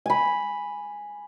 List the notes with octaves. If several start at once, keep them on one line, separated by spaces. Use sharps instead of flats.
G#5 B5